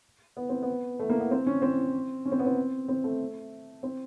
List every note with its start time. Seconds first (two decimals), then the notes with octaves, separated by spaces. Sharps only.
0.37 B3
0.49 C4
0.63 B3
1.00 A3
1.10 A#3
1.20 B3
1.31 C4
1.47 C#4
1.62 C4
2.25 C#4
2.32 C4
2.39 B3
2.46 C4
2.88 C4
3.04 A3
3.83 C4